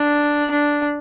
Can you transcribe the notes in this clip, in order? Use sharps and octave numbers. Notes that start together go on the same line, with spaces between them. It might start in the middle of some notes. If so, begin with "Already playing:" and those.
Already playing: D4
D4